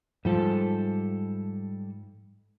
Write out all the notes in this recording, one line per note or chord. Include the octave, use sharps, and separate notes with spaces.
G#2 F3 G3 A4